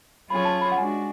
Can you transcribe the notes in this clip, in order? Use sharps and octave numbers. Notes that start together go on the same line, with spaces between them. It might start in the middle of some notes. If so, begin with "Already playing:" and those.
F#3 C#4 F4 G#4 C#5 B5
A5
B5
F#5
G#3 D4 F#4 G#5